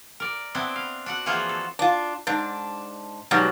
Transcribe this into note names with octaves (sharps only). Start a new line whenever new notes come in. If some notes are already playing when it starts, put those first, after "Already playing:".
A#4 D5
B3 C4 D4 E4
F5
D4 F#4 F#5
E3 F3 A#3 F4 F#4 G#4
A4
D4 F4
G#2 D4
G#2 B2 F#3 G3